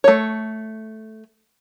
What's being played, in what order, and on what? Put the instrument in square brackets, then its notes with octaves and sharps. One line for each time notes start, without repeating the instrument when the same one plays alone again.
[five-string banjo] A3 C#5